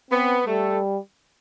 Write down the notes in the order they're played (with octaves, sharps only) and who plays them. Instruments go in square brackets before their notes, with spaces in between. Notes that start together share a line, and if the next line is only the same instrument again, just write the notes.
[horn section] B3 B4 [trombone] C4
[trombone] G3 [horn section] A3 A4